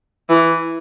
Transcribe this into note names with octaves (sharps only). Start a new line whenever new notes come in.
E3